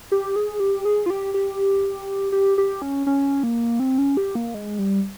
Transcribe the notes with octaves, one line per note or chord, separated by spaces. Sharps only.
G4
G#4
G4
G#4
F4
G4
G4
G4
G4
C#4
C#4
A#3
C4
C#4
G4
A#3
G#3
G3